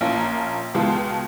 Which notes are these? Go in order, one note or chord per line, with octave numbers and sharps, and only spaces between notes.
A#1 A#3 C#4 F4 A5 A#6
C#2 B2 G#3 F4 A5